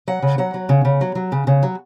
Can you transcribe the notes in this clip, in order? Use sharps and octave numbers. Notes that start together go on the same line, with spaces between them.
F#3 F#5
C#3
F#3 F#5
F#3
C#3
C#3
F#3
F#3
C#3
C#3
F#3